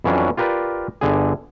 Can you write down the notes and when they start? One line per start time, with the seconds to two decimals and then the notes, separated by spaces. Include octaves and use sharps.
0.04 F2 E3 F#3 C#4 D4
0.37 F4 G4 A#4 B4 D5
1.01 G1 D3 G#4